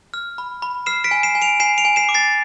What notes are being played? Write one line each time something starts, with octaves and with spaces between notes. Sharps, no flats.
F6
B5
B5
F6 C7 E7
B6 D7
G#5
C7 E7
G#5
D7 F7
G#5 C7 E7
D7 F7
G#5
C7 E7
D6
A6 C7